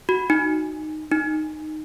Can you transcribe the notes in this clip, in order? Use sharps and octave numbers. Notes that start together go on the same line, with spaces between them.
F#4
D#4
D#4